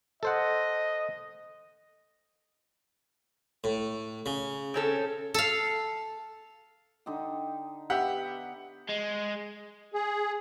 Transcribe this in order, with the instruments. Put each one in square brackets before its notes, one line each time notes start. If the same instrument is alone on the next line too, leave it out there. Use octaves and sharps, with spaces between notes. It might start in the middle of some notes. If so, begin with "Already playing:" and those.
[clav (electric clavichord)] A4 C5 F#5 [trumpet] D#5
[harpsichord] A2
C#3
[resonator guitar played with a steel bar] C4 C#4 A4
[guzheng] A4 F5
[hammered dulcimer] D3 D#4 G4
[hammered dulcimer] B3 [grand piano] G4 E5 [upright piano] F#5
[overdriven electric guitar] G#3
[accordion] G#4